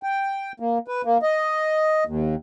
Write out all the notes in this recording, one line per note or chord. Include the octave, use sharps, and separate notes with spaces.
G5
A#3
B4
A#3
D#5
D#2